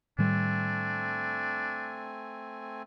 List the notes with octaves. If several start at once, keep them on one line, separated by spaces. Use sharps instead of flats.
A2 D#3 G3 A3 C4 D4 G#5